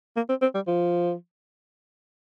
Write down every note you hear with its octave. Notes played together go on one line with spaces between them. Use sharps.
A#3
C4
C4
G3
F3